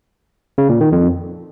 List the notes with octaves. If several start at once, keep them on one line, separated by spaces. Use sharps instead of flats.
C#3
A#2
D#3
F2